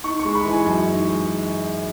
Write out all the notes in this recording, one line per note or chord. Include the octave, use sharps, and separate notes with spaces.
D#4 C#6
C#6
G#3
B5
E3
G#5
F#2
D#4
G#3